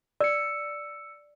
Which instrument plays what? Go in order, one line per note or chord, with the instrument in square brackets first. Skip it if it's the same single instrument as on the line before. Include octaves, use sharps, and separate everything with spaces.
[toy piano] D5 [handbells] E6 C#7